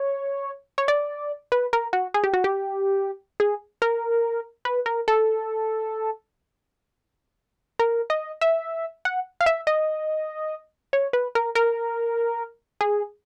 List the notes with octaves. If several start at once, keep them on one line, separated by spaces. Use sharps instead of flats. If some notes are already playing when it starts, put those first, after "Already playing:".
Already playing: C#5
C#5
D5
B4
A#4
F#4
G#4
G4
F#4
G4
G#4
A#4
B4
A#4
A4
A#4
D#5
E5
F#5
F5
E5
D#5
C#5
B4
A#4
A#4
G#4